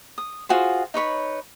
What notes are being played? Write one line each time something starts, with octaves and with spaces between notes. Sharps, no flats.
D#6
F4 F#4 G#4 C5
D#4 B4 C#5 B5